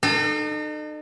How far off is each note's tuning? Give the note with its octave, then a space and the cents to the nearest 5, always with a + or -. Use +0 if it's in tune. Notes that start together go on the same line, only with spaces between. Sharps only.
D#4 -40 A4 +0